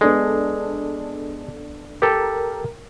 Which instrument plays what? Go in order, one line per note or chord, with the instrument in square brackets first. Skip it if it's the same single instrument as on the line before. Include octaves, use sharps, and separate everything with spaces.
[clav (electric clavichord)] G#3 [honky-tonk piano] B3 D4 A4
[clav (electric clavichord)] G4 A4 [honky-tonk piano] A#4